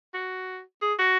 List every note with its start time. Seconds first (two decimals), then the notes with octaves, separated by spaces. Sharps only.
0.14 F#4
0.81 G#4
0.99 F#4